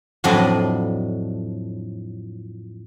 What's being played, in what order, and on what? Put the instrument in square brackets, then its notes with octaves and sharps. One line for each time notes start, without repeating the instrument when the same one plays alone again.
[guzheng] F2 A2 F#3 D4 D#5 B5